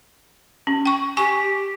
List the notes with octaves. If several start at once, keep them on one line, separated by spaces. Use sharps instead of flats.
C#4
G5 C#6
G4 G#5 C#6